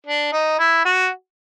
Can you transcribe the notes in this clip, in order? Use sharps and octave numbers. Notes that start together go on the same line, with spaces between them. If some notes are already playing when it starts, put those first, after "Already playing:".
D4
D#4
E4
F#4